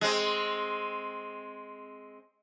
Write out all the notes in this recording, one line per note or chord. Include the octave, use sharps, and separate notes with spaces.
G#3 C4